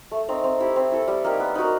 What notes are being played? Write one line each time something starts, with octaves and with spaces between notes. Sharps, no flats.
A3
C4 D#4
C4
E4 G4
C4
E4 A4
G3
A#3 D#4 G4
B3
D#4 F#4 A#4